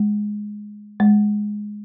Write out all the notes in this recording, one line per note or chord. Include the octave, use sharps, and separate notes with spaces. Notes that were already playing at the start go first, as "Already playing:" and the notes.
Already playing: G#3
G#3